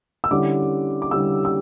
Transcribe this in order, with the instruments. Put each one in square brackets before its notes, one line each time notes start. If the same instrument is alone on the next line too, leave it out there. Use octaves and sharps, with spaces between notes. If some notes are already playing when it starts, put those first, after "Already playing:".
[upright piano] E6
D3 G3 C#4 E4 D6
D6
D3 G3 C#4 E4 E6
E6